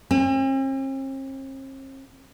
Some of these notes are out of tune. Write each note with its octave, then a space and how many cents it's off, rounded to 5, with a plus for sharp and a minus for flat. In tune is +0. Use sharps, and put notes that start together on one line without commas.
C4 +45